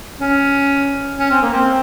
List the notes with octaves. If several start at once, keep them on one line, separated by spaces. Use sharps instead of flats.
C#4
C#4
C4
A#3
C4